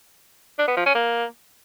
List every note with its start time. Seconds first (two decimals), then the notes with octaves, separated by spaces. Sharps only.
0.58 D4
0.68 B3
0.77 F3
0.86 C#4
0.95 A#3